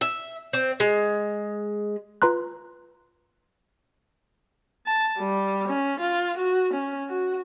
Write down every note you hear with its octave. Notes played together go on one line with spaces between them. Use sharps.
E5
C4
G#3
F4 B4 A#5 C6 F#6
A5
G3
C#4
F4
F#4
C#4
F#4